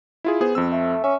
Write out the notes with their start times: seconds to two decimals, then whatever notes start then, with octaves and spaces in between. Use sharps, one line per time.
0.24 E4 F4 G#4
0.41 B3 G#4 C5
0.55 F2 C4 E6
0.72 A3
1.04 C#4 E5